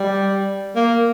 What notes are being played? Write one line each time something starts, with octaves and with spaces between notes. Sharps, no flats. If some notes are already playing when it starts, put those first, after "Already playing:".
Already playing: G3
A#3